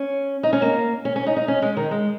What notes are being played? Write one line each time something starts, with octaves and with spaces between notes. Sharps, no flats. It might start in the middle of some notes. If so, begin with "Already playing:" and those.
Already playing: C#4
D#4
C#4
A#3
C#4
C#4
D#4
D#4
C#4
G#3
D#3
G#3